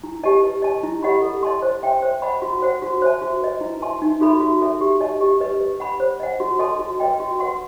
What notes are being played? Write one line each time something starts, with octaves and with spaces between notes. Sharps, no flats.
E4
G4 D#5 A5
B4
D#5 A5
E4
G4 D#5 F#5 B5
A4
D#5 A5 C6
C5
E5 G5 C6
C5
D#5 F#5 B5
F#4
C5 F#5
F#4
C5 E5 A5
F#4
B4 D#5
E4
B4 E5 A5 C6
D#4
F#4 A4 E5 B5
F#4
A4 E5
G4
D#5 A5
G4
B4 D#5
B4
F#5 B5
C5
D#5 F#5
F#4
A4 D#5 A5 C6
F#4
B4 D#5 G5
F#4
B4 F#5 C6